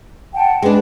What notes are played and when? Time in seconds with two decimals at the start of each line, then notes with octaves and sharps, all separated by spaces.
0.33 F#5 G5 A5
0.62 G#3 D4 B4